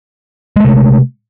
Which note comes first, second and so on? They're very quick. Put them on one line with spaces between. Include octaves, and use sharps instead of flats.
G#3 A3 C3